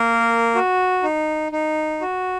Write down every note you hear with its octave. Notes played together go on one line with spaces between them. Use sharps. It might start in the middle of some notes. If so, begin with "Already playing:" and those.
Already playing: A#3 A#4
F#4
D#4
D#4
F#4